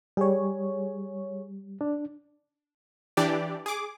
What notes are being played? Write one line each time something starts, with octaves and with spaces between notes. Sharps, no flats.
G3 G#4 C#5
D4
E3 D4 G4 D5
G#4 D6